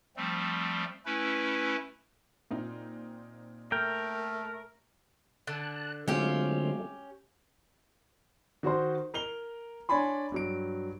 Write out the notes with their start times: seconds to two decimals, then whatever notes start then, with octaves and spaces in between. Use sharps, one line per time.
0.17 F3 G3 A3 C4
1.06 A3 C#4 E4 B4
2.51 A#2 C4 D#4
3.72 A3 A#4 G5
5.47 D3 A5 F#6
6.08 D3 F#3 G#3 A3 C4 C#4 F4 G4
8.63 D#3 F#4 A#4 C5 C6
9.14 A#4 F7 G7
9.89 D4 C#5 D5 G#5 B5 C6
10.32 G2 F#3 D7